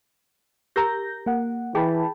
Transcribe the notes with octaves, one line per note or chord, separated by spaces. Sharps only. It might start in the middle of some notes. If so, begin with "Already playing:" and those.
G4 A#4 A#5 G6 A#6
A#3 F#5
E3 G#4 G5 A5 B5